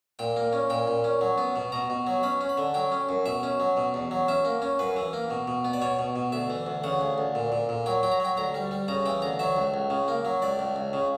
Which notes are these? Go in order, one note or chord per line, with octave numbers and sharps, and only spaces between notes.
A#2 G5
A#3
C#4
A#2 G5
A#2
C#4
F#3
B3
B2
B2 A#5
B2
F#3
C#4 B5
C#4
B5
D3
F#3 G5
C#4
F#2
B2 E5
C#4
F#3
B2
E2
F#3
C#4 E5
A#3
C#4
F#2 B4
E3
A#3
B2
B2
B3
D5
B2 C#5
B2
B2
D2 E5
E3
D2
C#3 F#5
D2
D2
A#2
A#2
A#2
F#3 G5
F#3 G5
A#5
F#3 G5
D2 A#5
G3
G3
C#3 A#5
E3 G5
D2 A#5
F#3 E5
C#2
C#2
C#3
A#3
F#3
C#2 D5
C#2
C#2
C#3